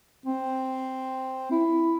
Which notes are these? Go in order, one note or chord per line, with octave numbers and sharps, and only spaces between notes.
C4
E4